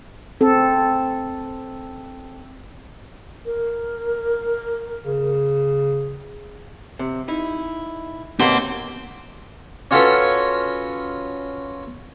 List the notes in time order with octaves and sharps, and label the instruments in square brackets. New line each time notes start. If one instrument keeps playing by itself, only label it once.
[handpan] C4 A4
[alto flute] A#4
[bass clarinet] C#3
[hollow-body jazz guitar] C3
D#4 E4
[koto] B2 A#3 [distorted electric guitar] C4 C6 [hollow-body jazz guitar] G4 C5 C#5
[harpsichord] C#4 F4 F#4 A4 B4 C#5